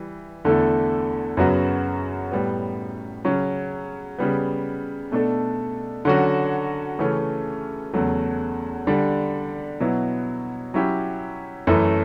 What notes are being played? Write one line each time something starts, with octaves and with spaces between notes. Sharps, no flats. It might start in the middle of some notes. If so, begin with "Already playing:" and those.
Already playing: E3 G3
E2 D3 A3 E4
F#2 C#3 F#3 B3 F#4
A2 G3 B3
C#3 F#3 C#4
C#3 G3 B3
B2 A3 D4 A4
D3 F#3 C#4 F#4
C#3 E3 A3 C#4
E2 C#3 F#3 A3
D3 G3 D4
B2 F#3 B3 E4
F#3 C#4 E4 G4
F#2 E3 A3 E4